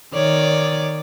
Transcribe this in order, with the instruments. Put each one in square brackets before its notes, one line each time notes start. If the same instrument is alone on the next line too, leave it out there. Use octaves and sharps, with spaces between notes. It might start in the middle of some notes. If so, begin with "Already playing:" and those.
[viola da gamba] D#3 C#5 D5